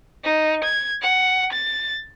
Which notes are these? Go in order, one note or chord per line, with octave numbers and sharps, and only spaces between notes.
D#4
G#6
F#5
A6